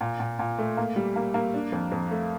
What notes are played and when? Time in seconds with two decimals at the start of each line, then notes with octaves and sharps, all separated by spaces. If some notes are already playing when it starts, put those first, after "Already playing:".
0.01 A#2
0.20 A#2
0.39 A#2
0.58 A3
0.77 A#3
0.96 G3
1.16 A#3
1.34 A#3
1.54 D4
1.72 F2
1.92 F2
2.11 A3